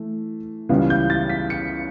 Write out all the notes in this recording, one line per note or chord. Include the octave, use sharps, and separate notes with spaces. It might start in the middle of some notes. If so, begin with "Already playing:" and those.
Already playing: E3 A3
C#2 C#3 E3 G3 B3
G6
A6
B6
C#7